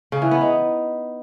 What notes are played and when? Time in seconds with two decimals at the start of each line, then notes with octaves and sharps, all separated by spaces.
0.12 C#3
0.22 E3
0.31 B3
0.41 D#4